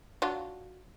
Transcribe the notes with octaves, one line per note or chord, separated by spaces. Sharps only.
F#3 D4 F4